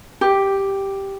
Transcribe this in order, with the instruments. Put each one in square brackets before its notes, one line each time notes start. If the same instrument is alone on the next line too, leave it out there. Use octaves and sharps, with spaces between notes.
[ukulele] G4